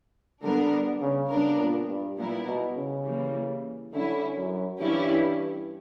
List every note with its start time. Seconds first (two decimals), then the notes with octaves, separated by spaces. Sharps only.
0.42 D3 G3 B3 D4 A#4
1.01 C#3
1.30 C#3 G3 B3 D4 A#4
1.59 A#2
1.88 G2
2.18 A#2 G3 B3 E4 A#4
2.46 B2
2.76 C#3
3.05 E3 G3 A#3
3.93 D3 G3 C#4 E4
4.37 F#2
4.80 G2 E3 G3 C#4 E4 G4